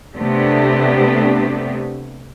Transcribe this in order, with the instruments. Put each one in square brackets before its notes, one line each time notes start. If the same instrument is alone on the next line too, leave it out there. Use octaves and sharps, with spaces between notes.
[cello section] C3 A3 B3 D4 G4